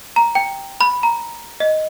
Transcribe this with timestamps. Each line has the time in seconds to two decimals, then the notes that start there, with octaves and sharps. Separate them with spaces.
0.16 A#5
0.35 G5
0.81 B5
1.03 A#5
1.60 D#5